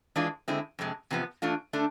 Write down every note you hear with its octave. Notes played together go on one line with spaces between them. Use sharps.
E3 G#3 D4 F4
D3 G#3 C4 E4
F2 C3 G#3
E2 C3 F3 B3
E3 A3 D4 F4
D3 A3 D4